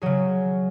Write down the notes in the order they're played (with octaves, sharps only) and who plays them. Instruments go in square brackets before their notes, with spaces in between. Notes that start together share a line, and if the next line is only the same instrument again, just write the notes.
[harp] C#3 F#3 G#4